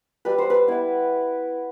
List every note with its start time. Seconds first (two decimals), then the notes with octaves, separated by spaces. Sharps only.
0.25 G3 B4
0.38 C5
0.50 B4
0.67 B3 E4